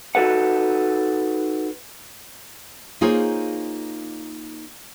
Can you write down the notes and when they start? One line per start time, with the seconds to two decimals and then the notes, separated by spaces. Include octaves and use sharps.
0.15 D#4 F#4 A4 B4 F#5
3.01 A#3 D#4 F4 G#4 C5 C#5